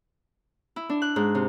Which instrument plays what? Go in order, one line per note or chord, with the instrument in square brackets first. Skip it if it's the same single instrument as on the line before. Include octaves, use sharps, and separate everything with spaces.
[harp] E4
D4
F#6
G#2
C3